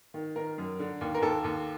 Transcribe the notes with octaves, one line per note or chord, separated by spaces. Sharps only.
D#3
D#3 A#4
F#2
D3
D#2
A#4
D#2 A4
D#2